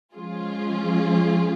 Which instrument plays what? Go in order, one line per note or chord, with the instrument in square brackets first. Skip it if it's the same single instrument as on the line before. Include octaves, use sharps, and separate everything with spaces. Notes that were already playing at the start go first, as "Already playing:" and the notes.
[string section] F3 G#3 C#4 F4 G#4